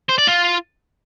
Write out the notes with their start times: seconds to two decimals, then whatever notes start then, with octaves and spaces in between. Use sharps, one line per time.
0.09 C5
0.19 D5
0.28 F4